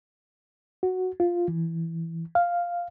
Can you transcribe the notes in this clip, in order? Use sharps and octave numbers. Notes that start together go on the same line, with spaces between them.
F#4
F4
E3
F5